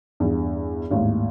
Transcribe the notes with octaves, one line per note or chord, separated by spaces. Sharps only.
E2 G2
G#1 D#2 A2